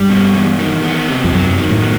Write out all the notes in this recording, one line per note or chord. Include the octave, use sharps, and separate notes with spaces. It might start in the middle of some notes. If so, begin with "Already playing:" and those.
Already playing: G2 G3
B2
E2
D#3
B3
C3
F2
F#2 F#3
D#3
A2
B3